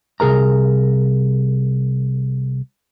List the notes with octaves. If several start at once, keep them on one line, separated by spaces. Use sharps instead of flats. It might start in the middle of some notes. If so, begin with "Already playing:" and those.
C2 G#4 A#4 A#5